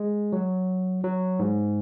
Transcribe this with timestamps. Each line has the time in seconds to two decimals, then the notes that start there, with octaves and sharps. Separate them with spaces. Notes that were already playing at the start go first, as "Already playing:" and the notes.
Already playing: G#3
0.33 F#3
1.04 F#3
1.39 G#2